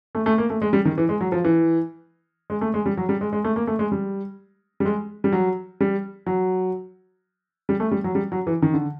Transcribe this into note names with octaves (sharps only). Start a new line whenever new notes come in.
A3
A3
A#3
A3
G#3
G3
D#3
E3
G#3
F#3
F3
E3
G#3
A3
G#3
G3
F#3
G3
G#3
G#3
A3
A#3
A3
G#3
G3
G3
G#3
G3
F#3
G3
F#3
G3
A3
G3
F#3
G3
F#3
E3
D#3
D3